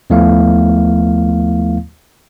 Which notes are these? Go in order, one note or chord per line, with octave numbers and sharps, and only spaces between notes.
D#2 F3 A3 B3 E4 F5